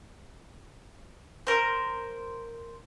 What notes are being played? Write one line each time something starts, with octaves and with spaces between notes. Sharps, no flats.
A#4 C5